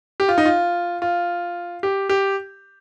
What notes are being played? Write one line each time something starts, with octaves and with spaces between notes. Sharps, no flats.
G4
F4
D#4
F4
F4
G4
G4